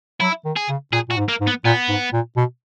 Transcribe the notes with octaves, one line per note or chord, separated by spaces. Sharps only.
F#3 E4
D#3
G#4
C#3
A#2 G#4
A#2 F#4
G#2
A#3
G#2
B3
A#2 B3
G#2
A#2
B2